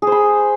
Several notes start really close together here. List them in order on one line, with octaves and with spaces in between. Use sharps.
G#4 C5 B5